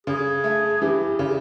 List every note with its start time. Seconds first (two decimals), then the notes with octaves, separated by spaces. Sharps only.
0.06 C#3 G#4
0.44 A3
0.81 E3 G4
1.19 C#3